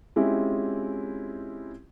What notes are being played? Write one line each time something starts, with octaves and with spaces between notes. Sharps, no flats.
G#3 C4 C#4 E4 F4 G4